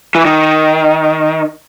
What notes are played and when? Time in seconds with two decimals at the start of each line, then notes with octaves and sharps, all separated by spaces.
0.15 E3
0.25 D#3